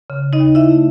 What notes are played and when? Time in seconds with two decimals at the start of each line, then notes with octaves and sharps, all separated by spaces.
0.10 C#3
0.33 D#4 D#5
0.40 D#2
0.55 E4 E5
0.70 A3